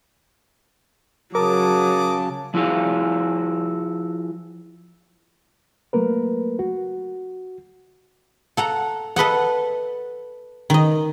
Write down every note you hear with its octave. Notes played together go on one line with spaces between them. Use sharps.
C#3 F#3 A#4 A5 D6 D#6
F3 E4 F#4 G#4 F5
F#3 A3 A#3 A#4 B4
F#4
A4 F#5 A#5
A4 B4 D#5 F#5
D#3 D#5